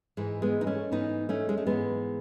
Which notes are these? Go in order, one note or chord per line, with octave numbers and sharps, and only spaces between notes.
G#2 E3 G#3
G#3 B3
D#4
A3 C#4
G#2 E3 B3 D#4
A3 C#4
G#3
A3
G#2 E3 G#3 B3